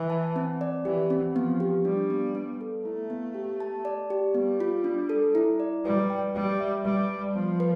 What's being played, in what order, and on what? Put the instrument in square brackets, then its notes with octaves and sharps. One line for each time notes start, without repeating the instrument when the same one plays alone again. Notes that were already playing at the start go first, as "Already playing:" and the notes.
Already playing: [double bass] E3
[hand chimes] A5
C4
D5
[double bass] E3 [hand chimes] G4
[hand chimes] C4
[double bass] F3 [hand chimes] B3
[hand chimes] G4
[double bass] G3 [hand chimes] D4
[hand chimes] B3
B3
A4
[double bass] A3 [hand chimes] E4
[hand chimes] B3
G4
A5
D5
G4
[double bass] G3 [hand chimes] B3
[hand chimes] F4
D4
A4
E4
D5
[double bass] G3 [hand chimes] B4
[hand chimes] G5
[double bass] G3 [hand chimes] G4
[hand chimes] E5
[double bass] G3 [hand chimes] B4
[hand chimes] A5
[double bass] F3 [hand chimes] B3
[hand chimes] B4